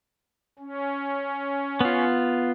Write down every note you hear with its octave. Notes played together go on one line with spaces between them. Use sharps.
C#4
B3 F4